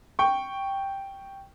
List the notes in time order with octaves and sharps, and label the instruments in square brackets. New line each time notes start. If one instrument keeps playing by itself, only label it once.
[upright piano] G5 C#6